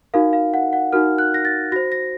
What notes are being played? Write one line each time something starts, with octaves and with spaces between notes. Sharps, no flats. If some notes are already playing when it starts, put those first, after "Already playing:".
D#4 F#4 A#4 F5
F5
F#5
F#5
D#4 F#4 A#4 F6
F#6
A#6
A6
F#4 C5 A#6
A#6